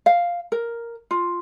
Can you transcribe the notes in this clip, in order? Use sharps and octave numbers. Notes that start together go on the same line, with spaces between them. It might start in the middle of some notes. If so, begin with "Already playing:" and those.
F5
A#4
F4